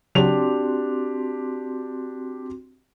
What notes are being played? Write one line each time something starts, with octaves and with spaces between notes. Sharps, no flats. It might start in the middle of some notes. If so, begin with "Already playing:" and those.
C#3 F#3 C4 D4 F#4 G4 C6 F7